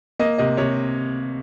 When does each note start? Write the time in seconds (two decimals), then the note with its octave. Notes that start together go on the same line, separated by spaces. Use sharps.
0.19 A#3 D#5
0.38 C3 D#5
0.57 C3 C#5